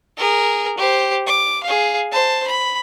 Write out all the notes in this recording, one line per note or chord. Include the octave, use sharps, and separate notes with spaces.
G#4 A#4
G4 C5
D6
G#4 F5
C5 A5
B5